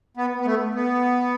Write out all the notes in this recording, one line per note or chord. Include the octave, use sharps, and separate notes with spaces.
B3
B3
A3
B3